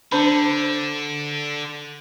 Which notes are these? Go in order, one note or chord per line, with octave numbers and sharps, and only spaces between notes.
D3 D4 C5 B5